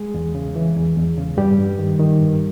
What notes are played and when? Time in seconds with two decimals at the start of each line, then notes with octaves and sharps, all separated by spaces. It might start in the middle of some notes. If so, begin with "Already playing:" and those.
Already playing: G#3 G#4
0.14 E2
0.35 C#3
0.55 E3
0.76 E2
0.97 E2
1.17 C#3
1.37 G2 G3 G4
1.59 G2
1.79 D#3
2.00 D#3
2.20 G2